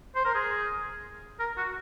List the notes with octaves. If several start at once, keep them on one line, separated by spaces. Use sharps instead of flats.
C5
A#4
G#4
A#4
F#4